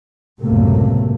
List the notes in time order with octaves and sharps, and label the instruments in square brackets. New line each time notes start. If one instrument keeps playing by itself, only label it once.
[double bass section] C#2 F#2 A2 C3 A3 A#3